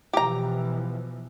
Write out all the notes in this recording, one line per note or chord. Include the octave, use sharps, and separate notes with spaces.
B2 E3 F3 G4 A#5